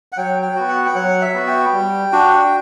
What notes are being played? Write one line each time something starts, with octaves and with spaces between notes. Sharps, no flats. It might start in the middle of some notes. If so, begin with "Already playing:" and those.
F#5
F#3 G5
G5
B3 F#4
F#5
G5
F#3 F#5
E5
B3 F#4
G5
G3
D4 F#4